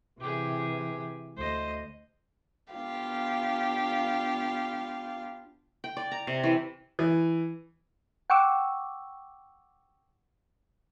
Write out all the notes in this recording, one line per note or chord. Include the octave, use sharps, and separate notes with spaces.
C3 E3 G4 G#4
D2 C5 D#5
B3 D4 F4 G4 F5
G5
D5
A#5
C3
E3
E3
F#5 G5 C#6 D6 E6